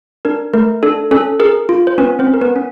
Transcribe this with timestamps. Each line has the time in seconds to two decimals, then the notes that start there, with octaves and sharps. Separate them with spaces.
0.25 D4 A#4
0.54 A3 A#4
0.83 D4 A4
1.11 C#4 A4
1.40 G#4 A#4
1.69 F4
1.87 C5
1.98 B3 C#4 B4
2.19 C4 C5
2.27 C#4
2.34 A#4
2.41 B3 B4
2.56 C#4